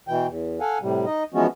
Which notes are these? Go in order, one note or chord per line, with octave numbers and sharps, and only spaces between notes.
B2 E3 G5
E2
A4 F5 F#5 G#5
A2 C3 G3
D#4 D#5
E3 F3 G#3 B3 C#4 F#4